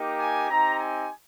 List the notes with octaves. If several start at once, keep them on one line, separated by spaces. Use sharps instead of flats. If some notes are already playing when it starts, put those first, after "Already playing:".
Already playing: A#3 D#4 G4
G#5
C4 D#4 G4 A#5
G#5